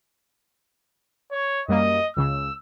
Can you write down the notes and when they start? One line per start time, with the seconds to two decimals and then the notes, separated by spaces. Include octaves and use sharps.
1.32 C#5
1.68 F#2 G3 A#3 D#5
2.17 C#2 C#3 E6